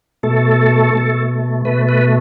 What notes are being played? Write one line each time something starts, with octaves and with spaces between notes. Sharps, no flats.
B2 A3 A4
B2 A3
B2 A3 B4
B4